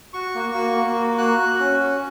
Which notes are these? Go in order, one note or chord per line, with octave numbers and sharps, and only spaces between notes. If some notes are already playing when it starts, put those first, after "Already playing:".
F#4 C#6
A#3
F#4
A#3
F#4
F#4 F#6
F#4
C#4
F#4